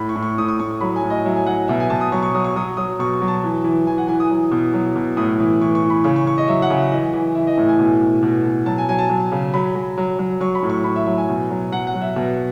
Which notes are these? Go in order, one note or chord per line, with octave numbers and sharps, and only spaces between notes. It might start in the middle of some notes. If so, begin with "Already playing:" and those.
Already playing: A2 B5
C#6
A2
C#6
A2 D#6
D#6
A2 C#6
C#6
F#3 B5
G#5
A2
D#5
F#3 E5
G#5
F#3 F#5
B2 E5
G#5
B2 A5
D#6
F#3 C#6
C#6
F#3 D#6
C#6
F#3 D#6
F#3 D#6
B2 C#6
C#6
F#3
A5
E3
E3
E3 G#5
F#5
E3 G#5
D#6
F#3
B2
F#3
B2
A2 D#6
E3
E3 C#6
C#6
E3
B5
C#3 C#6
C#6
C#3 C#6
D#5
F#3 E5
F#5
C#3
E5
E3 D#5
E3
E3 E5
D#5
A2 E5
G#5
B2
B2
B2
B2
F#3 A5
G#5
F#3 G#5
A5
F#3
C#3
F#3 B5
F#3
F#3
F#3
F#3 C#6
B5
A2
C#6
A2 B5
E5
F#3 E5
G#5
B2
F#3
F#3 F#5
F#5
F#3
E5
B2